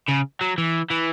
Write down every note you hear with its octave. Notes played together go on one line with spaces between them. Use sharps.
C#3
F#3
E3
E3